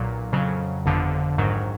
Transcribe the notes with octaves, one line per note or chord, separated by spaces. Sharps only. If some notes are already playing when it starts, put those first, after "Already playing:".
Already playing: B1 A#2 F#3
F2 C#3 F#3
G1 F2 D3 F3
A#1 G#2 D#3 F#3